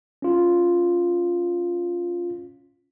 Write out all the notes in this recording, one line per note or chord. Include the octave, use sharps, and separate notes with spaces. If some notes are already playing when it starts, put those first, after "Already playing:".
C#4 F4